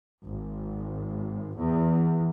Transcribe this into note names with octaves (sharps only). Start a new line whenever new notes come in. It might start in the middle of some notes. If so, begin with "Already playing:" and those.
G#1
E2